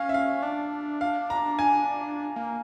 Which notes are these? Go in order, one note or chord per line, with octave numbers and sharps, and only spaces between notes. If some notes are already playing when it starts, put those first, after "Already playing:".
Already playing: C#4 F5
E5
F5
D4
F5
A#5
G#5
A#3